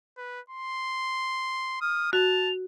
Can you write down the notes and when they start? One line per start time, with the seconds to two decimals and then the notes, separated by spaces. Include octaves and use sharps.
0.18 B4
0.50 C6
1.81 D#6 F6
2.13 F#4 A5 F7